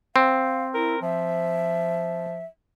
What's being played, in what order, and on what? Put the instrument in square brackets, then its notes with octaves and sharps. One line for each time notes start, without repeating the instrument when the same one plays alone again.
[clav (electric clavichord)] C4 [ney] F5
[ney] E4 [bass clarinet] A#4
[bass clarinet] F3 [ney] E5